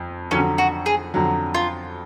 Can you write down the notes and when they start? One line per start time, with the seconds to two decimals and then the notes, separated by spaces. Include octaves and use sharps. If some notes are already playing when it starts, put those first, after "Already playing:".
Already playing: F2
0.31 F2 D3 F#3 C#4
0.58 F#4
0.86 G#4
1.14 F2 D3 F#3
1.54 F4